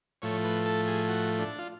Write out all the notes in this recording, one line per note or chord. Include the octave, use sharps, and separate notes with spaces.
A2 F3 A3 C#5
B4
A4
G#4
F#4
D4
F4